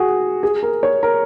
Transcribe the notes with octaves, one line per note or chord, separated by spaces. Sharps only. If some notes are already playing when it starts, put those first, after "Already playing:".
Already playing: F#4 G#4
G#4
A#4
C#5
A#4